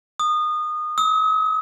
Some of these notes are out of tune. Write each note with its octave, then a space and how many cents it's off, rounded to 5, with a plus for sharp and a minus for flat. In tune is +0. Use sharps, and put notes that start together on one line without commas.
D#6 -25
D#6 +45